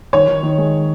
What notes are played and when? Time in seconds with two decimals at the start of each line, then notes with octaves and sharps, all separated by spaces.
0.13 D#3 C#5
0.28 D#3
0.43 D#3
0.58 G#3